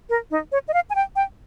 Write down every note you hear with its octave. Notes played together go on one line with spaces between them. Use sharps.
A#4
D#4
C#5
D#5
F5
G#5
G5
G5